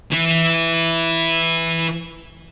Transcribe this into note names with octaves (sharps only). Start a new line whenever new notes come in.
E3 E4